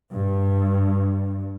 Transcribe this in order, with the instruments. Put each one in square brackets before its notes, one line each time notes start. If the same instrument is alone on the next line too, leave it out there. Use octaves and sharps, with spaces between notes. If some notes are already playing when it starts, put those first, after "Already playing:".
[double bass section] G2